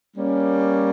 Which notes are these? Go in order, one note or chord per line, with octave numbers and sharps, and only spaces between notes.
G3 A#3 C#4